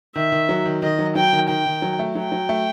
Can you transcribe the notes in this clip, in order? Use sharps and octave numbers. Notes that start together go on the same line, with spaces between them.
D#3 E5
D#3
F#3
D#3
D#3 D#5
F#3
F#3 G5
D#3
D#3 G5
D#3
F#3
A3
F#3 G5
F#3
A3